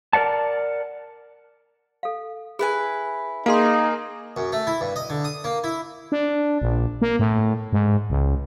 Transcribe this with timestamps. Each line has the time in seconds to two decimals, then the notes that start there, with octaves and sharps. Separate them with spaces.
0.13 A#4 B4 D5 F#5 A5
2.03 A4 F5
2.59 E4 G#4 B4 G#5
3.46 A#3 D#4 G#4 F5 C6
4.37 F#2
4.52 A3
4.67 E4
4.81 G2
4.96 D#5
5.10 D3
5.24 D#6
5.44 A#3
5.64 E4
6.12 D4
6.62 A#1
7.02 A#3
7.19 A2
7.73 G#2
8.10 C#2